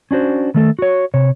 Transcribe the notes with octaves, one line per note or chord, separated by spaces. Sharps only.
C#4 D4 F#4 C5
D#3 A3 A4
F#4 C#5
C3 C#5